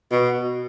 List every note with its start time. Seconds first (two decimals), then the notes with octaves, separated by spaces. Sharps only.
0.12 B2